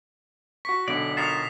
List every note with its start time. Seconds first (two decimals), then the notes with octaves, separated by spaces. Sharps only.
0.65 F#4 C#6 B6
0.88 B1 B2 D3 D5 C#7
1.17 F4 F#4 A#4 D#6 C7 E7